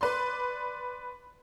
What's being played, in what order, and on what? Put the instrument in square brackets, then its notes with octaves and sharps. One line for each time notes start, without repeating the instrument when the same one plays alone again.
[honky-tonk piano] B4 D5 C6